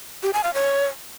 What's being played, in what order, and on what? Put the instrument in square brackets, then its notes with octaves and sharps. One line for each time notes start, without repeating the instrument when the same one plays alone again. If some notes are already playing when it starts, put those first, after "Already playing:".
[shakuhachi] G4
G#5
F5
C#5